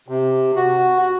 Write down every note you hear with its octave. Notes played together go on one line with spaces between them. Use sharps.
C3
F#4
F#4